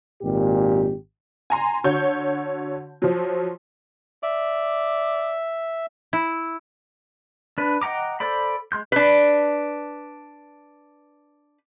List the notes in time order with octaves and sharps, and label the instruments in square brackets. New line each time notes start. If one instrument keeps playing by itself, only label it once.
[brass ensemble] G#1 A#2 G4
[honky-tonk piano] G#5 A#5 C6
D3 F#4 C#5 G6
F3 F#3
[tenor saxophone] D5 [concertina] E5
[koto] E4
[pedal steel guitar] D4 B4
D#5 F#5 G5 A#5 D6
A4 C5 D5 B5
G#3 C6 G6
[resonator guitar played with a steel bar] D4 B4